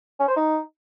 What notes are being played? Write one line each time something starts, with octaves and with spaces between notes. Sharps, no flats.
C#4
C5
D#4